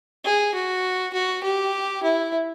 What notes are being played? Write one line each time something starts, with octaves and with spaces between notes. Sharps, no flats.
G#4
F#4
F#4
G4
E4